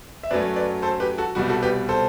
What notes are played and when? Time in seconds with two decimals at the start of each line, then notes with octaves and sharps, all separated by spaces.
0.23 E5
0.31 F#2 F#3 A3 B4 D5
0.56 B4 D5
0.82 A4 C5
1.00 G4 B4
1.18 F#4 A4
1.35 C2 B2 G3 F#4
1.49 F#4 A4
1.62 G4 B4
1.89 A4 C5